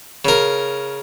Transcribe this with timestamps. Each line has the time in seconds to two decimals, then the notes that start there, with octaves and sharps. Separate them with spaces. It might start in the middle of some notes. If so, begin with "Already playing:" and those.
0.25 C#3 A#4